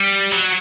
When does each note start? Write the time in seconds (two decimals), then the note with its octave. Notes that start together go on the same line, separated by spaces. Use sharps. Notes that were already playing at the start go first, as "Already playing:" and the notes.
Already playing: G3
0.32 F#3